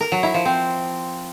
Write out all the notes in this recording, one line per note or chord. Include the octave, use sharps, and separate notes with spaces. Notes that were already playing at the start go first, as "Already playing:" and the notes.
A#4
F#3
E4
F3
C4